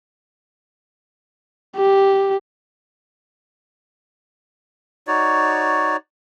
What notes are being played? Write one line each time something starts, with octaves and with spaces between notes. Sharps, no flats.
G4
D#4 F#4 C#5 D5